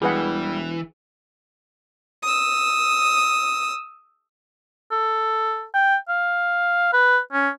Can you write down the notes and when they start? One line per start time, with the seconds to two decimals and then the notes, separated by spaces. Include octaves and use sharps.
0.02 E1 E3 G3 G#4 B4 F#5
2.23 D#6 E6
4.91 A4
5.74 G5
6.09 F5
6.93 B4
7.33 C#4